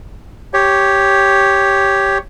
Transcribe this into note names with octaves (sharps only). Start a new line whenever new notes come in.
G4 C#5